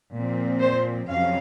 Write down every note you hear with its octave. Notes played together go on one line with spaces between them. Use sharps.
A#2 F3 C4
C5
F2 C3 F#3 C#4 F5